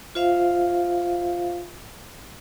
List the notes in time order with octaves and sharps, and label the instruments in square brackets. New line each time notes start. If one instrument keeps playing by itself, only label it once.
[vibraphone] F4 C5 E5 F5